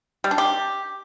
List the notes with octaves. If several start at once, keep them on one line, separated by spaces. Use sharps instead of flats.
G3
D4
G4